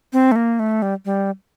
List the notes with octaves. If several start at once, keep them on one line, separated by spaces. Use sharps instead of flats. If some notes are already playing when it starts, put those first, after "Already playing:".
C4
A3
A#3
A3
G3
G3